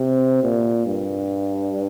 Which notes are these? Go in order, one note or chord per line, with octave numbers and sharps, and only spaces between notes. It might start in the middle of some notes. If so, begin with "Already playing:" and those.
Already playing: C3
A#2
G2